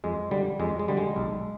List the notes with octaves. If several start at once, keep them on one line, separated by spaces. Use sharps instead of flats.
F2 G#3
D3 G3
F2 G#3
G#3
D3 G3
G#3
B1